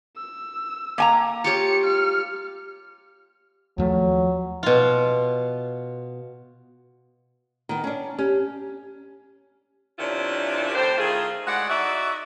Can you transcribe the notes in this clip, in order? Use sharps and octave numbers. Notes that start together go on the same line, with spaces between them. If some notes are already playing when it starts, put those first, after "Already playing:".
E6
A#3 G#5 A#5
F4 G4 C#5 C#7
F6
D#2 F3 F#3 A3
B2 F4
D#3 B3
C#4 D4
C#4 G4
C3 D#3 C#4 D4 E4 F4
A2 D3 G4 C5
D#3 A3 F4 G#4
A2 G#3 D5 F#5
D#4 F#4 D5 E5